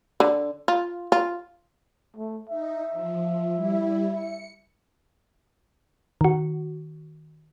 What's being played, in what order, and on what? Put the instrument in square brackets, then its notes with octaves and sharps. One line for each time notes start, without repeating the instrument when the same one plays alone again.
[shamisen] D3
F4
F4
[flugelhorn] A3
[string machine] D#4 [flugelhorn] E5
[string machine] F3
G3 E4
C#7
[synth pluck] D#3 F#4